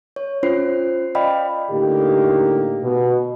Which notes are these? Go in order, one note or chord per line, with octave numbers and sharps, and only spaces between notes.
C#5
C#4 F4 C5 C7
D5 D#5 F5 G5 B5
A2 D3 A#3 D#4 G4
B2